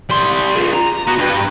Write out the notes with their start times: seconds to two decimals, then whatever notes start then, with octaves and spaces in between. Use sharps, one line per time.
0.10 G3 C6
0.55 F4 G#4
0.73 A#5
1.07 B3 F#4
1.18 G2 B4